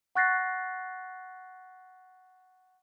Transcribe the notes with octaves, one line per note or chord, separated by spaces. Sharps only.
F#5 C#6 F#6 A6 A#6 C7